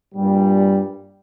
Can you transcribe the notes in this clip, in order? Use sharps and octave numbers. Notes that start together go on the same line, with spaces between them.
G2 A#2 G3